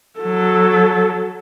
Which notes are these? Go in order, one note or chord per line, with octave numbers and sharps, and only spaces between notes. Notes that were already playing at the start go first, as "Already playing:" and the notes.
F#3 A4